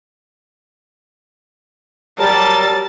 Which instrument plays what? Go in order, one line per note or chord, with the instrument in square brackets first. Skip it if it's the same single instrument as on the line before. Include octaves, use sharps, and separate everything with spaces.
[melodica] F#3 A#4 [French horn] G3 [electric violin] A5 A6